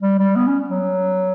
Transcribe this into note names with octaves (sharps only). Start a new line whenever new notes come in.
G3
G3
B3
C#4
F#3